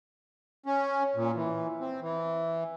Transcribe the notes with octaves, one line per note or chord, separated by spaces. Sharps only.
C#4
A#2
E3
C4
E3